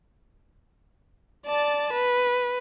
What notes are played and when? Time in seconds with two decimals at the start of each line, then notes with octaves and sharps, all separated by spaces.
1.47 D5 A5
1.93 B4